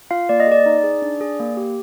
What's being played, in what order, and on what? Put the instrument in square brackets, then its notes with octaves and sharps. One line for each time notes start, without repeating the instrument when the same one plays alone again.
[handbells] F4 F5
A#3 D5
D#5
G#4 D5
D#4
G#4
D4
G#4
A#3
G4